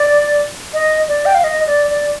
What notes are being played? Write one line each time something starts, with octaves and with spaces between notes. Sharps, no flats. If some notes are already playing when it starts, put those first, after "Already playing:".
Already playing: D5
D#5
D5
G5
F5
D#5
D5
D5